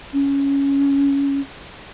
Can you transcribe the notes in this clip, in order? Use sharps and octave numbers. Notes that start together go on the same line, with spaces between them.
C#4